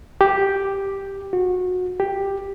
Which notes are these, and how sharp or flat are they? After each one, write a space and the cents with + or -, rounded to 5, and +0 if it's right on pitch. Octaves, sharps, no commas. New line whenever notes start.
G4 +0
F#4 -25
G4 +5